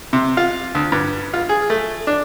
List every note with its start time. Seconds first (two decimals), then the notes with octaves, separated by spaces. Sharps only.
0.13 C3
0.37 F4
0.75 D2
0.92 G2
1.33 F4
1.49 G#4
1.70 A3
2.07 D4